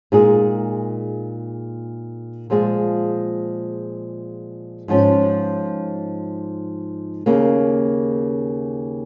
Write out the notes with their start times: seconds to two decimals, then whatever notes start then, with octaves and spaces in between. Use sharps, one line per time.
0.12 A#2 G#3 D#4 G#4
2.50 A#2 F3 G#3 F4 G#4
4.88 G#2 F3 C#4
7.26 D#2 C#3 A#3